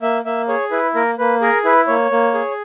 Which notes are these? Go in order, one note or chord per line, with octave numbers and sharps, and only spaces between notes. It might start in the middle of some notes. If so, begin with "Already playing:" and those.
A#3 E5
A#3 E5
G#4 C#5
E4 B4
A#3 A#4
A#3 B4
G#4 A#4
E4 B4
A#3 C#5
A#3
G#4